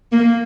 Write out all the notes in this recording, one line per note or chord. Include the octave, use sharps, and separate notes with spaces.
A#3